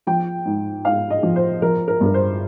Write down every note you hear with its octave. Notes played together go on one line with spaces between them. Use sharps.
F3 G5
G#2
G#2 F5
D#5
F3
C5
F3 A#4
A#4
G2
A#4
C5